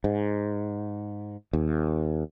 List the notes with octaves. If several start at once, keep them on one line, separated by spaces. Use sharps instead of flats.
G#2
D#2